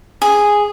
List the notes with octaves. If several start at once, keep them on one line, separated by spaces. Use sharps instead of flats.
G#4